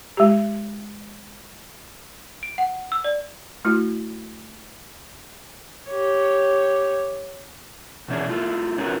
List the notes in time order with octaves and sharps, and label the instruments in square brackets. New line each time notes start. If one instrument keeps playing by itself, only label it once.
[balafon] G#3 G4
[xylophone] D7
F#5
E6
D5
[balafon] A3 E4 F#4
[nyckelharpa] G4 C#5
[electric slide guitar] B2 E3 C#4 D4 G#4
A3 E4 F4
C#4 D#4 F4 F#4 A#4 B4